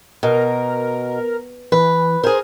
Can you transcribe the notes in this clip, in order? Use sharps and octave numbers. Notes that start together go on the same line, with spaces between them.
B2 A#4
E3 B4
G#4 A#4 C5